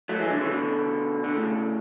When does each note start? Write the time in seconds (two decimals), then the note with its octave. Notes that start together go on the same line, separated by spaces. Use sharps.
0.09 F#3 A3
0.20 E3 G#3
0.30 D3 F#3
0.41 C#3 E3
0.51 B2 D3
1.24 D3
1.35 A2 C#3